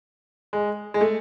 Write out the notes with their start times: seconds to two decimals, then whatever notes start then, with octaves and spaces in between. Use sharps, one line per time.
0.53 G#3
0.94 G#3
1.01 A3